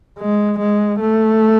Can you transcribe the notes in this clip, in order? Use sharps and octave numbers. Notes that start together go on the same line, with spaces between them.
G#3
G#3
A3